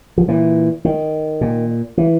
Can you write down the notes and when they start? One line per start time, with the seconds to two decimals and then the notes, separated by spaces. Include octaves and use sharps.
0.18 F3
0.28 A#2 E3
0.85 D#3
1.41 A#2
1.98 E3